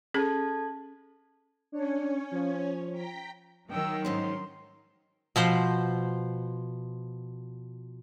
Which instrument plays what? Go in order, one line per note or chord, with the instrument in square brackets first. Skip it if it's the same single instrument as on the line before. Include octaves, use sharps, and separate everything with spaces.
[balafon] C#4 G#4 [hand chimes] A4 A5 G#6
[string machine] C#4 C#5 [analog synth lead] D4
[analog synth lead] F3
[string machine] G5 A#5 B6
[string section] D#3 F#3 [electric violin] G5 E6
[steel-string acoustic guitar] G#2 C#4 D#4 [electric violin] C6
[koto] B2 F3 C5